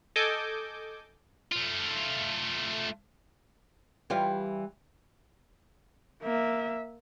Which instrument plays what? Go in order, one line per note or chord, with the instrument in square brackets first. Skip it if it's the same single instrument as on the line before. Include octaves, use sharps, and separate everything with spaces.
[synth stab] A4 D#5 G#5 D6 G6
[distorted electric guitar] A3 F4
[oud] E3 G3 F4
[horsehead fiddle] A#3 E5